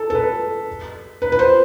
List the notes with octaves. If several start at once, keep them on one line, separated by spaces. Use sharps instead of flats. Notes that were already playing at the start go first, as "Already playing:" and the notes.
Already playing: A4
A4
B4
B4
B4
C5